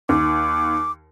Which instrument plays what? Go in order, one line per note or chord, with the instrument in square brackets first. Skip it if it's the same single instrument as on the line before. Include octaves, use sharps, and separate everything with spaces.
[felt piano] D#2 [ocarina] D6